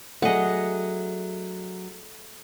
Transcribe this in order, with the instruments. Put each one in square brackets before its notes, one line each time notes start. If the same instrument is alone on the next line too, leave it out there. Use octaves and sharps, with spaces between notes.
[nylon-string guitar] F#3 D4 [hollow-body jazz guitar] A3 G#4 [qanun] D#5 F#5